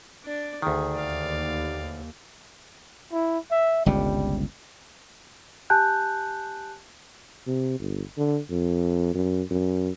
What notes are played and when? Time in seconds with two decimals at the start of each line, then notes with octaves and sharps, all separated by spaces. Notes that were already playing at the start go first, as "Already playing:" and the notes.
0.25 D4 D5
0.62 D2 D#3 G#4
0.94 D#2 D5 F5
3.12 E4
3.51 E5
3.86 G1 C#2 C3 G3
5.70 G4 G#5 A5 F#6 G6
7.47 C3
7.79 G1
8.17 D3
8.50 F2
9.15 F#2
9.51 F#2